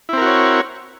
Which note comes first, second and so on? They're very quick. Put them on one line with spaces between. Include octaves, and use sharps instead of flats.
E4 C4 A#4 F#4 C#5